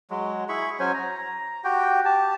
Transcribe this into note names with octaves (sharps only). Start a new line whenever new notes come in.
F#3 G#3
E4 G#4 B5 C#6
F#3 C#4 C5 G#5
A#5
F#4 G4 G5
G4 A5